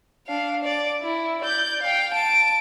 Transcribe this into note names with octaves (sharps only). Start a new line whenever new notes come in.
D4 F5
D5
E4
D5 G6
F5 G5
A5 D7